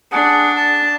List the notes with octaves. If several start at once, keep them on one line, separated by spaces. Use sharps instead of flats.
D4 G#4 F#5
A5